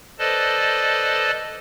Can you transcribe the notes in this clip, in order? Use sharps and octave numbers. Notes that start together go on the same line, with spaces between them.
A4 B4 C5 D5 D#5 A5